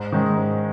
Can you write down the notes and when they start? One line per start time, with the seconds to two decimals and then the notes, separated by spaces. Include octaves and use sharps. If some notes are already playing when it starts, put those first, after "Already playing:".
Already playing: G#2
0.12 D#3 G#3 C#4
0.37 G#2